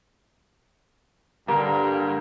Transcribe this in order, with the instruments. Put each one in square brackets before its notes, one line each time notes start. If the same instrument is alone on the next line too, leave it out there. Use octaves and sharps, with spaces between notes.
[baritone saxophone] G2 [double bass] D3 [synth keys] G3 [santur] A#3